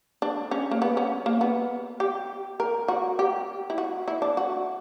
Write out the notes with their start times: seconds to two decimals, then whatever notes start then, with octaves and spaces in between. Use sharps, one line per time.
0.22 D4
0.51 C#4
0.71 A#3
0.82 B3
0.97 C#4
1.26 A#3
1.41 B3
2.00 G4
2.60 A#4
2.88 F#4
3.19 G4
3.70 E4
3.78 F#4
4.08 E4
4.22 D4
4.37 F#4